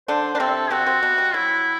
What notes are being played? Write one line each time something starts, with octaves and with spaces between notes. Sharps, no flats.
D3 D4 C5
D4
C3 C4 A4
C3 C4 F#4
C3 C4
B2 B3
G3
F#3 E4